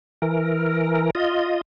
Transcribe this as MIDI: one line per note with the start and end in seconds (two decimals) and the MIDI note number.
0.22 1.10 52
0.22 1.10 70
1.15 1.61 65
1.15 1.61 75